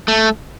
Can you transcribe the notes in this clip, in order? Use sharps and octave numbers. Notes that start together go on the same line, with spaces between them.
A3